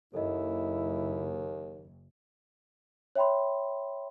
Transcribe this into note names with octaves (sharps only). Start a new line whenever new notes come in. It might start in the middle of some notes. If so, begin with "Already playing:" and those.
F#1 D#2 E4 A4 D#5
C#5 E5 G5 B5 C6